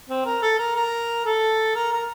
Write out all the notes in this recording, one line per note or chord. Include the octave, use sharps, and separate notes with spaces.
C4
A#4
A4
A#4
A#4
A4
A#4
A#4